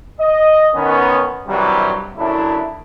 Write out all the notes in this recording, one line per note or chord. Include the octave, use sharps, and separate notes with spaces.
D#5
D#3 B3 C#4
G2 C3 D#3 E3 F#3 G3
F#2 C#3 A3 D4 E4